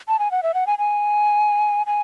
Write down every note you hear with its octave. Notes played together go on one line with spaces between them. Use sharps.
A5
G#5
F#5
E5
F#5
G#5
G#5
G#5